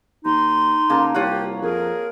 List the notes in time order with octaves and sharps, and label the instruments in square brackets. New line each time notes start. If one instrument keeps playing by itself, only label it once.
[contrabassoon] D#2 [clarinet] D#4 [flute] C6
[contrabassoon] C#3 [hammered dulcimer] A#3 A5
[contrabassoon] C2 [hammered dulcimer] F4 C#5 F#5 [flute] G4
[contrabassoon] F2 [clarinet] G#4 [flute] A#4